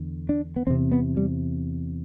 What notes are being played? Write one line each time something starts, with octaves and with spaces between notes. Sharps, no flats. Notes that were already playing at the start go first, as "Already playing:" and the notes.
Already playing: E2 D3
D4
B3
E2 C3 C4
B3
G3